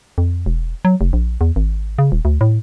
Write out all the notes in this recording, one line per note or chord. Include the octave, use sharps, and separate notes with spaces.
F2
E1
F#3
F1
A#1
E2
G#1
C#3
D#1
D2
A2